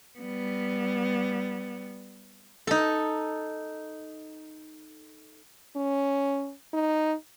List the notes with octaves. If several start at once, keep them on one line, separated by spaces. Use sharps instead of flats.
G3 B3
D#4 A4
C#4
D#4